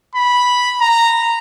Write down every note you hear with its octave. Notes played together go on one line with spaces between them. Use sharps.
B5
A#5